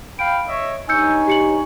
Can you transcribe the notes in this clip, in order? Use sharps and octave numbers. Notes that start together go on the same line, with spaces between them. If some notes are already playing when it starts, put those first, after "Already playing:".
F5 G5 B5 D7
C#5 D#5 E5
G2 D#4 C#5 G#5 E6 G6 C#7
G4 C#7 F#7